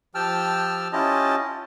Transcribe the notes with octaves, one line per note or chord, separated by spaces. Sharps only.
F3 G4 G5 A5 E6 F6
C#4 E4 F4 G4 D#5 A5